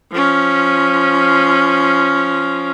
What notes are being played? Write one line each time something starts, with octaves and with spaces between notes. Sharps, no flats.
F3 C#4